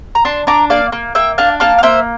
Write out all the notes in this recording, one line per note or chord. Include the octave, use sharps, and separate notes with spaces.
A#5
D4 A5 C6
D4 A#5 D6
A#3 D5 F5
A#3
A#3 E5 G5
D4 F5 A5
A#3 F5 A5
F5
A#3 C5 E5